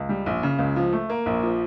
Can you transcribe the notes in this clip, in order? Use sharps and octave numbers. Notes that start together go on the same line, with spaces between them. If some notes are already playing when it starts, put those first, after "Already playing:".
Already playing: C#2
G3
A#1
C#3
C#2
F3
A3
A#3
A#1
F3